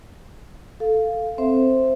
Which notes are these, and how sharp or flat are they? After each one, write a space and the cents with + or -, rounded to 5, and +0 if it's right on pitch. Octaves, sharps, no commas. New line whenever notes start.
A4 +0 F5 +0
C4 +0 C5 +0 E5 +0